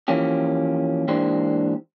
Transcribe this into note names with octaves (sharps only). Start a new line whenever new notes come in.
E3 F3 A#3 C#4 G4
G#2 E3 A#3 D4 G4 C5